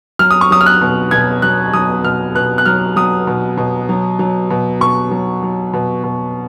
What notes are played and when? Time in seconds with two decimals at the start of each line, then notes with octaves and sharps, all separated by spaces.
0.19 F#3 F6
0.30 D#6
0.41 C#6
0.51 F#3 D#6
0.61 F6
0.66 F#6
0.81 B2
1.11 B2 G#6
1.42 F#3 F#6
1.73 F#3 D#6
2.04 B2 F6
2.35 B2 F#6
2.58 F#6
2.66 F#3 F6
2.96 F#3 D#6
3.27 B2
3.57 B2
3.89 F#3
4.19 F#3
4.50 B2
4.80 B2 C#6
5.11 F#3
5.43 F#3
5.73 B2
6.04 B2